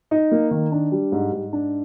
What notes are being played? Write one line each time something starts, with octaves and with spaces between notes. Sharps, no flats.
D#4
A#3
D#3
D4
G3
G#2
G#2
D4